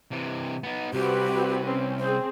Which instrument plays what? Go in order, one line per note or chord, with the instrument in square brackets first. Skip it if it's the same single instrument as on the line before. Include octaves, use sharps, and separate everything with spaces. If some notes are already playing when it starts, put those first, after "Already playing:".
[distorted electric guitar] C3 E3
B3 D#4
[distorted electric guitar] C2 [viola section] C4 F#4 B4 [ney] G4
[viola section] C4 C#4
[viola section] C4 G#4 [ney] C5